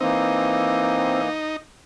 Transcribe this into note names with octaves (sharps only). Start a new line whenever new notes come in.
E3 A#3 C4 D#4